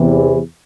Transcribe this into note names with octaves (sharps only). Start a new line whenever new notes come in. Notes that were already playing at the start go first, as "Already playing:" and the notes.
Already playing: E2 C3 E3